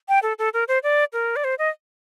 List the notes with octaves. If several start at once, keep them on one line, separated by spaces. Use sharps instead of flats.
G5
A4
A4
A#4
C5
D5
A#4
D5
C5
D#5